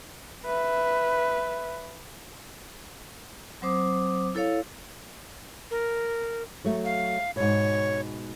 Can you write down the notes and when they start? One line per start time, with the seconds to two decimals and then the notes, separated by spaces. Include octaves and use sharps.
0.46 B4 E5
3.62 F#3 C4 C5 D6 D#6
4.35 E4 A4 C#5 F5
5.71 A#4
6.64 F#3 A3
6.85 F5
7.36 G#2 B2 C#5